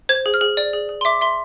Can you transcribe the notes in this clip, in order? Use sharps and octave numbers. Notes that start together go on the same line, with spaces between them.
C5 G#6
G#4
F6
G#4
D5
G#4
G#4
C6
E5 D6
E5 C6